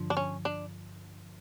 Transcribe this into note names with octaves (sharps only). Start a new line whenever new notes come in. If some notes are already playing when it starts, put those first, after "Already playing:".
Already playing: G2 D3 F3
D4
C#4
D4